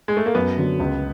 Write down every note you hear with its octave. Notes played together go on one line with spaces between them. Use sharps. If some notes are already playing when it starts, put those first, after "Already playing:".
G#3
A3
A#3
F#2 B3
D3 F#3
C#2